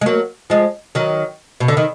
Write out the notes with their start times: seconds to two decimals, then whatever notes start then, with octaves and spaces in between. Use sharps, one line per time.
0.01 G#3
0.06 F#3 A#3
0.50 F3 G#3
0.95 D#3 F#3
1.60 B2
1.68 D3
1.77 D#3